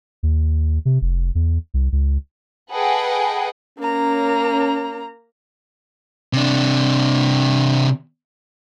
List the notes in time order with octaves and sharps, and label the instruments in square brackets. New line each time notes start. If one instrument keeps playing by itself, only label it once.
[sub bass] D#2
C3
F1
E2
C2
C#2
[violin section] G#4 A4 B4 D#5 F#5 G5
[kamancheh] A#3 A#5 [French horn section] C#4
[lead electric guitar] C3 D4